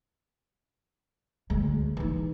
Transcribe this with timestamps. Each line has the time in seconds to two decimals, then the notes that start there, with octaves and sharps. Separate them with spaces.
1.50 D2 G#3
1.97 E3 D#4